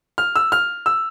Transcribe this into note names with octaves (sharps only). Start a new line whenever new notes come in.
F6
E6
F6
E6